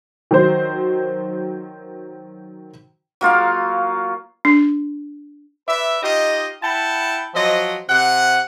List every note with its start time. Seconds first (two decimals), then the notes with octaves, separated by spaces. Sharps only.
0.31 D#3 F#3 C5
3.21 F#3 A#3 F4 F5
4.45 D4
5.67 B4 D5 E5
6.03 D#4 F4 G4 D#5
6.62 E4 F#5 G5 A5
7.34 F3 F#3 C5 D#5
7.89 C3 F#5